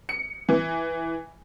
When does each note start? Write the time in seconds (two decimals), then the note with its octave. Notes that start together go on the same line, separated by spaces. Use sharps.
0.09 C#7
0.49 E3